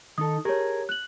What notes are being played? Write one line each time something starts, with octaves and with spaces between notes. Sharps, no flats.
D#3 D#4 A4 D#6
G4 G#4 A#4 C#5
F#6 F#7